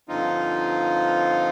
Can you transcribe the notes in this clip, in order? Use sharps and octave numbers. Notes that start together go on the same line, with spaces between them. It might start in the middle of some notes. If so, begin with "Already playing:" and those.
G2 D3 F3 C4 D#4 F4